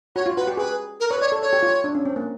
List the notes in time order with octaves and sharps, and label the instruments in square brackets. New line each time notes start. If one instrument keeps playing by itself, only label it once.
[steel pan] F#4 [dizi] C#5
[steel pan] F4
[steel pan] F#4 [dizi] B4
[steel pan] G4
[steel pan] G#4 [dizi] B4
[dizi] A#4
[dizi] B4 [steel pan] C#5
[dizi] C#5 [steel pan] D5
[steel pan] A4
[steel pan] A4 [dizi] C#5
[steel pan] G4
F4
D4
C#4
C4
A#3